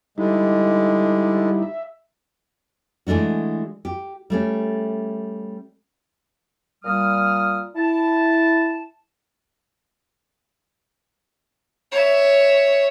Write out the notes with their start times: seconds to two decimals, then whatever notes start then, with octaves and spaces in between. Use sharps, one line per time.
0.18 D3 G3 G#3 D#4 E4
1.63 E5
3.07 E3 G#3 A3 D4 F#4
3.85 G4
4.30 G3 A3 C#4
6.84 A#2 G3 D#6 F6
7.76 E4 A5
11.91 C#5 E5